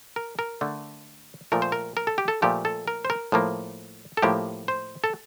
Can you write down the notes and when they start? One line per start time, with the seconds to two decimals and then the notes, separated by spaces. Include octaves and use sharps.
0.16 A#4
0.39 A#4
0.61 D3 A3
1.52 A#2 F3 A3 A#4
1.62 C5
1.72 A#4
1.97 A#4
2.07 A4
2.18 G4
2.28 A4
2.42 A#2 F3 A3 G4
2.65 A4
2.88 A#4
3.05 C5
3.10 A#4
3.32 A2 F3 A#3
4.17 A4
4.22 A2 F3 A#3 G4
4.68 C5
5.04 A4